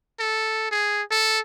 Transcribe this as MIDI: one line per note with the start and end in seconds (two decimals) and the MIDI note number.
0.20 0.67 69
0.71 1.02 68
1.11 1.40 69